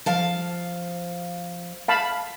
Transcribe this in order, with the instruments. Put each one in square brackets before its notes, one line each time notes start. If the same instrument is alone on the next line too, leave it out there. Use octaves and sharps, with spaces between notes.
[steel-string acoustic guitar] F3 F5 A5
[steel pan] F5 A5 B5